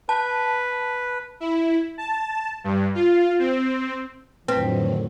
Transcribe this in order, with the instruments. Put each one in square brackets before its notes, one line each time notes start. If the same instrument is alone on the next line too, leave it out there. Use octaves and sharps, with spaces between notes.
[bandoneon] B4 [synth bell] A5
[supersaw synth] E4
A5
G2
F4
C4
[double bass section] F2 A2 [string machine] D3 D#3 F#3 [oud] C4 [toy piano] B4 F5